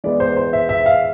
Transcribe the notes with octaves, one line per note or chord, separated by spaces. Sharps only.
E3 G#3 B3 D5
C5
C5
E5
E5
F5